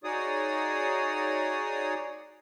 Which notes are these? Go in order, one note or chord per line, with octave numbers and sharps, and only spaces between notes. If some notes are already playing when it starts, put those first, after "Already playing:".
D#4 F#4 G#4 C#5 D5 D#6